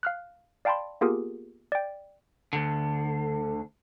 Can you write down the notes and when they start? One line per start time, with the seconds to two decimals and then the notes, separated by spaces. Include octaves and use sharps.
0.03 F5 F6 F#6
0.65 D5 F5 G5 A5 B5 C6
1.01 A#3 B3 F4 G4 G#4 A#4
1.72 D5 G5
2.53 D2 D3